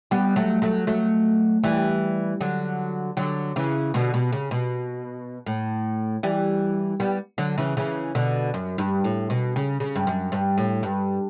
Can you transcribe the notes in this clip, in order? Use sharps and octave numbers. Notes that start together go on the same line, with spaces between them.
G3 B3
F#3 A3
F#3 A3
F#3 A3
E3 G3
D3 F#3
D3 F#3
C#3 E3
B2 D3
B2
C#3
B2
A2
E3 G3
G3 B3
D3 F#3
C#3 E3
C#3 E3
B2 D3
F#2
G2
A2
B2
C#3
C#3
G2
F#2
G2
A2
G2